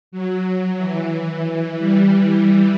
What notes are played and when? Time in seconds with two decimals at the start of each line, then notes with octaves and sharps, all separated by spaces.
0.12 F#3
0.78 E3
1.78 G3